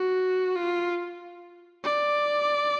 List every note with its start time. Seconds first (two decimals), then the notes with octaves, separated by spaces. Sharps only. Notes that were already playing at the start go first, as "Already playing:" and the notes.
Already playing: F#4
0.56 F4
1.84 D5